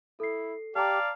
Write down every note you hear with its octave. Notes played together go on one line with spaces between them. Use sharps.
E4 A4 C7
G4 D5 F5 A5 A#5